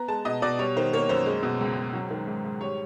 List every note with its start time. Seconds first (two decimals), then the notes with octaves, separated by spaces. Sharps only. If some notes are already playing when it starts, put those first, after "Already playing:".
Already playing: B3 A#5
0.08 G#3 A5
0.25 B2 D#5
0.42 B2 D5
0.59 G3 C#5
0.76 D#3 C5
0.93 A#3 C#5
1.09 F#2 C5
1.26 G#3
1.43 B2
1.61 C#2
1.77 C#2
1.93 F#3
2.10 D#3
2.27 G#2
2.45 G#2
2.61 G3 C#5